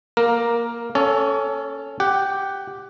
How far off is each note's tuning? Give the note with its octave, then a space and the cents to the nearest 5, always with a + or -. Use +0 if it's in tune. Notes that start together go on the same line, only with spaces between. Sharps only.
A#3 +10 A#4 +0
C#4 +0 A4 +0 C#5 +40
G4 +0 F#5 +20